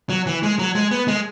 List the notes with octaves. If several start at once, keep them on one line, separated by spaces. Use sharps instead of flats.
F#3
E3
G#3
F#3
G#3
B3
G#3